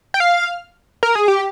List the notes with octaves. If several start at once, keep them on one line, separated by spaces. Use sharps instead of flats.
G5
F5
A#4
G#4
G4